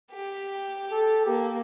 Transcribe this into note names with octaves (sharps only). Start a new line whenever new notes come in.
G4
A4
A#3 G4